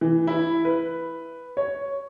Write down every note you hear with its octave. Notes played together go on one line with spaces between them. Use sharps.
E3
E4
B4
C#5